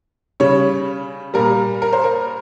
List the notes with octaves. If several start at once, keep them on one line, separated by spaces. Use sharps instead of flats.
C#3 G3 C#5
A#2 G3 A#4
A#4
C5
A#4